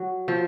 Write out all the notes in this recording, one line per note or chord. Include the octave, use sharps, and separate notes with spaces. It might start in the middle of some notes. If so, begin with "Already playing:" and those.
Already playing: F#3
F3